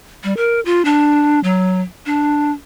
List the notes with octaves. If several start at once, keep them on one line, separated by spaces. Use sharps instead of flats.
G3
A#4
F4
D4
F#3
D4